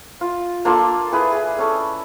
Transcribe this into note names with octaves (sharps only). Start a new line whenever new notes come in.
F4
A#3 D4 F4 A4
E4 G#4 B4
G#4
C#4 A4